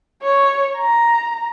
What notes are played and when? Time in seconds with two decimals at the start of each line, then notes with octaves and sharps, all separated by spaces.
0.23 C#5
0.77 A#5